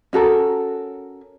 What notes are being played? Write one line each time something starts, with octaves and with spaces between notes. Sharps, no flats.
C#4 F#4 A4 A#4